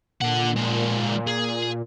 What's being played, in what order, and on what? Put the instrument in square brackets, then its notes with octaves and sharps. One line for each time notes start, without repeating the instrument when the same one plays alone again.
[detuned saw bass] A#2 [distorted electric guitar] D3 F#5
[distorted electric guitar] F3 G#3
G#4